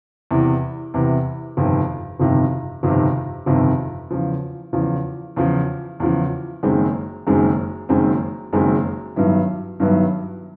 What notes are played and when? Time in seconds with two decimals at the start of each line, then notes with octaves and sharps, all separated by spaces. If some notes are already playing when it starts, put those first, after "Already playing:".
0.31 E2 C3 E3
0.94 E2 C3 E3
1.57 G1 F2 C3 D#3
2.20 G1 F2 C3 D#3
2.83 G1 F2 C3 D#3
3.46 G1 F2 C3 D#3
4.11 E2 C#3 F3
4.73 E2 C#3 F3
5.36 E2 C#3 F3
6.00 E2 C#3 F3
6.63 F#1 F#2 D#3 G#3 C4
7.27 F#1 F#2 D#3 G#3 C4
7.89 F#1 F#2 D#3 G#3 C4
8.53 F#1 F#2 D#3 G#3 C4
9.16 G2 D#3 F#3 B3 E4
9.80 G2 D#3 F#3 B3 E4